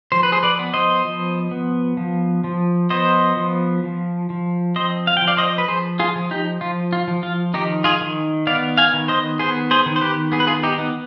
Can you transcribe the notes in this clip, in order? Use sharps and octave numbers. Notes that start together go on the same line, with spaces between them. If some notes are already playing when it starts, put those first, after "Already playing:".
F3 C5
B4
G#4 C5
B4 D5
B3
C5 D#5
F3
B3
F3
F3
B3 C5 D#5
F3
F3
F3
C4 C5 D#5
F5
G5
F3
D5 F5
C5 D#5
B4
F3 G#4 C5
F4 G#4
F3
D#4 G4
F3 F4
F4
F3
F4
D#3 D#4 G4
F4 G#4
D#3
B3 D5 F5
F5 G#5
D#3
C5 D#5
B3 G#4 C5
G#4 C5
D#3
C5
G4 B4
B3 G#4
B4
F4 G#4
D#4 G4
B3